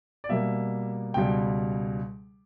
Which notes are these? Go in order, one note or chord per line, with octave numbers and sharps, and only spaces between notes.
D5
B2 G3 A#3 E5
C#2 B2 G3 G5